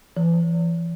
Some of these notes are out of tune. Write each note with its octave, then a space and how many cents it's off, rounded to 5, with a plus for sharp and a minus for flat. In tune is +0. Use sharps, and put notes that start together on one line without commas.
E3 +40